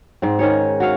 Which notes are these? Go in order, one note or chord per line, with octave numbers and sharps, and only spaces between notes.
G#2 C4
D#3 C#4 G#4 C#5
F#4 C#5 F5